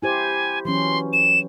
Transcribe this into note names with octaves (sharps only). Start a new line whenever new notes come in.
E4 G4 C5 G#5
E3 F#3 C#4 C6
E7